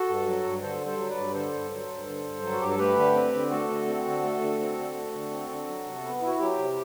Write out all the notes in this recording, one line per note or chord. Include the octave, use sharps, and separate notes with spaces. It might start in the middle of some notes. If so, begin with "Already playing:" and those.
Already playing: F#4 A4
G2
F#3
G2
D3 A4 C5
G2
A4 C5
F#3
B4 D5
G2
D3 A4 C5
G2
F#3
G2
D3
G2
F#3
F#4
G2 G4
A4
A3 G4 B4
D3
C4
D3
A3 F#4 A4
D3
C4
D3
A3
D3
C4
D3
A3
D3
C4
D3
F#3
C3
B3
E4
F#4
F#3 G4
C3